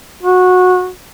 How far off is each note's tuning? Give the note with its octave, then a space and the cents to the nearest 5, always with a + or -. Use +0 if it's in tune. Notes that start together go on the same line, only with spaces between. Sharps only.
F#4 -20